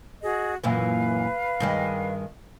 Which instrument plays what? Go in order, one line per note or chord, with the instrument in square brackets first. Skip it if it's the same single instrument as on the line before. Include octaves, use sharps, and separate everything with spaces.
[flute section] F#4 G#4 D#5
[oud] F#2 A#2 E3 [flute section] B4 F5
[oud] G2 D#3 G#3